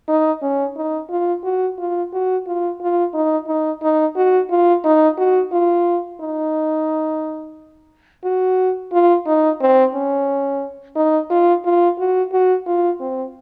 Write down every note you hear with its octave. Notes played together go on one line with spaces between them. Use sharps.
D#4
C#4
D#4
F4
F#4
F4
F#4
F4
F4
D#4
D#4
D#4
F#4
F4
D#4
F#4
F4
D#4
F#4
F4
D#4
C4
C#4
D#4
F4
F4
F#4
F#4
F4
C4